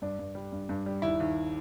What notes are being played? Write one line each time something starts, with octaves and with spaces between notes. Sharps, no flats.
G2 D4
G2
G3
G2
G2
G3
D#2 E4
D#2